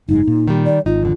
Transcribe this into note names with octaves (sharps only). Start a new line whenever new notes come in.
F#1 G#2 G#3 D#4
A#2
D#3 G3
D5
G#1 D#4 F4
F2 D3